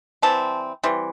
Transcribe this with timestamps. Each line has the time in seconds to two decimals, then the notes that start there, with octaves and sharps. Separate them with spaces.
0.22 E3 G3 C4 A5
0.83 E3 G3 C4